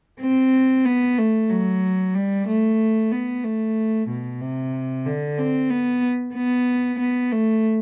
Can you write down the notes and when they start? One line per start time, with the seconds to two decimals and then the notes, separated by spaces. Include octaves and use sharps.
0.20 C4
0.85 B3
1.18 A3
1.49 F#3
2.15 G3
2.47 A3
3.11 B3
3.44 A3
4.08 B2
4.41 C3
5.05 D3
5.38 C4
5.70 B3
6.34 B3
6.99 B3
7.32 A3